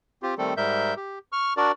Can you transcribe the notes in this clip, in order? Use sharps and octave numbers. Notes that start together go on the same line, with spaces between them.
C4 F4 G4
D#3 G3 A3 C4 A4
G#2 G3 A#4 E5 G6
G4
C#6 F6
D4 F#4 A#4 D5